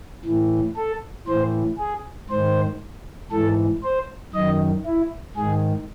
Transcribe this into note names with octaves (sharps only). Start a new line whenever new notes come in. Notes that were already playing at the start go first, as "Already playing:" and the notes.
A2 E3
A4
A2 E3 C5
G#4
G#2 D#3 C5
G#2 E3 A4
C5
F#2 D#3 D#5
E4
G#2 D#3 G#4